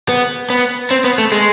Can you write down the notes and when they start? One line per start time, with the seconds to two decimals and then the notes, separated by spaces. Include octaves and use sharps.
0.09 B3
0.50 B3
0.91 C4
1.04 B3
1.18 A3
1.32 G#3